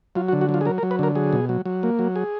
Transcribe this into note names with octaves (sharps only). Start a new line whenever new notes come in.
F#3 F4
F#4
D3
F#4
F#3
F4
G#4
F#3 A#4
A#4
F#3
B4
D3 A#4
F#3 G#4
B2
F#3
F#3
A#3
F#3
G#4